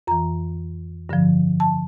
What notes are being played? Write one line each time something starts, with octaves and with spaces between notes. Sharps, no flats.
F2 E3 A#5
G2 D3 F3
A5